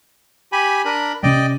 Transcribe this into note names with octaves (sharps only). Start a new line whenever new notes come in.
G4 G#5 B5
D4 A#4 B5
C3 C#4 D5 D#5 G5